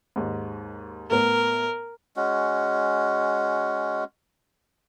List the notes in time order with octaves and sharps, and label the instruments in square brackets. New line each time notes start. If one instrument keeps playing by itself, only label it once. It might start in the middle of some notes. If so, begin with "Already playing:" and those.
[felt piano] D#2 G#2
[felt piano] A2 B3 [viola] A#4
[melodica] G#3 C#4 F#4